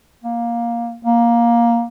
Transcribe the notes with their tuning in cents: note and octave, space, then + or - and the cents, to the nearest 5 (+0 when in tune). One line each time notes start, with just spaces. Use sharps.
A#3 +10
A#3 +10